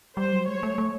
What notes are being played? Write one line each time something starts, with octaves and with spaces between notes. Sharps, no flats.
G3 C5
F#3
G#3 C#5
A3
A3